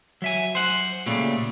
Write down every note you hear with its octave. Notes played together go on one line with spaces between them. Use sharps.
F#3 E5 G#5
C5 F#5
A#2 C#3 G3 A3